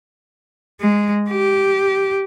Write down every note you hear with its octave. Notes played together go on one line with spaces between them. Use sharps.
G#3
G4